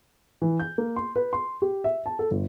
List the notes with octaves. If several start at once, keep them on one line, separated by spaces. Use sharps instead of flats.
E3
G6
A#3
C6
B4
C6
G4
E5
A5
A4
G1